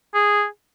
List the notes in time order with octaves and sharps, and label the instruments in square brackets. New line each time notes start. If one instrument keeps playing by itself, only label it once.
[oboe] G#4